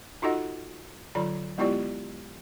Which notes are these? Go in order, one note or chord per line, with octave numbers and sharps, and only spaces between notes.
D#4 F4 F#4 A4 D#5 F#5
D3 F#3 F4 D5 B5
G#3 B3 E4 F4 G4 D5